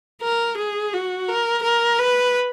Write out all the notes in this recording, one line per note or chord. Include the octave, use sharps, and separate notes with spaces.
A#4
G#4
F#4
A#4
A#4
B4